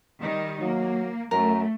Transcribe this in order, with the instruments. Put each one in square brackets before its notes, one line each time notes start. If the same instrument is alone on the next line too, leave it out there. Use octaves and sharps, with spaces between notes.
[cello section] D#3 G3 D#4
[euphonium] F#3 [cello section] A#3
[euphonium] F#2 [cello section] A3 [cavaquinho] A#4